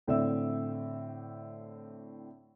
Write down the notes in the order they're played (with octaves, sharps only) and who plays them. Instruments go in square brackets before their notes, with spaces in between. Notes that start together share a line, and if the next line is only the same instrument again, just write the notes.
[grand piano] A2 D3 C4 D5 E5 E6